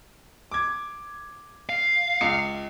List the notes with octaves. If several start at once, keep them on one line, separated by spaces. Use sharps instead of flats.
D6 G#6
F5
C#2 C#7